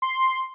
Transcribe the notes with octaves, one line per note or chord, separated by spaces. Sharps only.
C6